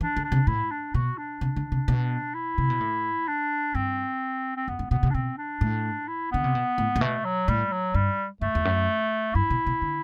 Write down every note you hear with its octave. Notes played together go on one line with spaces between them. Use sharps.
E3 D4
D3
D4
C3
A2 E4
D4
B2 F#4
D4
C3
D3
C3
B2
E4
C3
B2
A2
D4
G2 C4
C4
F#2 B3
G2
B2 B3
C3
D4
B2 C4
D4
A2
E4
D3 B3
C3
B2
A2
A2
B2 A3
F#3
A2 G3
F#3
G2 G3
G2 A3
E2
F#2
G2 E4
B2
B2
D3